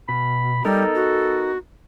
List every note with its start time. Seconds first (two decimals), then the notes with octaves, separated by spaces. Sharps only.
0.09 B2 B5
0.65 G3 B3 D#4 A4 A#4
0.95 F#4